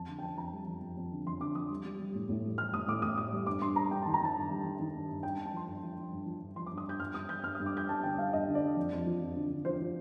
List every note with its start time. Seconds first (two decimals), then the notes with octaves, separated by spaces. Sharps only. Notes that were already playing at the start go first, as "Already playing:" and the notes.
Already playing: F2 A5
0.08 D3
0.19 G5
0.23 F2 A5
0.37 F2 A#5
0.52 G3
0.67 F2
0.81 F2
0.97 F2
1.12 D3
1.26 F2 C6
1.41 D3 D6
1.55 F2 D#6
1.70 G3
1.84 G3
1.99 G3
2.15 A2
2.29 A2
2.44 G3
2.58 G3 F6
2.74 A2 D#6
2.88 A2 D6
3.02 A2 D#6
3.17 A2 D#6
3.32 G3
3.47 G2 D6
3.61 G2 C6
3.76 G3 A#5
3.91 G2 G5
4.03 D#3 A5
4.14 A#5
4.21 D#3 A5
4.36 G2
4.50 G3
4.64 D#3
4.79 D#3
4.95 G2
5.09 G2
5.23 G2 G5
5.35 A5
5.38 G2
5.46 A5
5.53 F3 C6
5.67 G2
5.82 F3
5.98 F3
6.12 G2
6.26 F3
6.42 G2
6.56 F3 C6
6.66 G2 D6
6.78 D#6
6.86 G2 G6
7.00 G2 F6
7.14 G2 D#6
7.29 G3 G6
7.44 G2 F6
7.55 G2 D#6
7.66 D6
7.74 G3 G6
7.89 G3 A5
8.03 D3 G5
8.18 G3 F5
8.33 G2 D#5
8.48 D3
8.55 D5
8.63 D3
8.76 F2
8.92 F2
9.06 F3
9.21 F2
9.36 D3
9.50 D3
9.65 F3 C5
9.80 F3